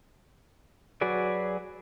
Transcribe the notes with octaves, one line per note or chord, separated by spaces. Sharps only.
F#3 F#4 G#4 B4 D5